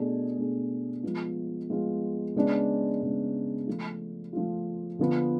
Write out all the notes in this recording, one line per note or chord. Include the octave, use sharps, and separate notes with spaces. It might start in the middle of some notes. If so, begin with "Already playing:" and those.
Already playing: B2 A3 D4 G#4
B2 A3 D4 G#4
F3 G#3 B3 F4
F3 G#3 B3 F4
C#3 G#3 B3 D4
C#3 G#3 B3 D4
F3 A3 F4
F3 A3 F4
D3 F3 B3